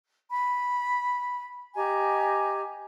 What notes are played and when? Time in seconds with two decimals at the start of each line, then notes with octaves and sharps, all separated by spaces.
0.29 B5
1.75 G4 D#5 G#5 A#5